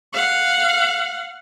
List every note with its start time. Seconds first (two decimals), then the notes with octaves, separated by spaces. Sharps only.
0.13 F5 F#5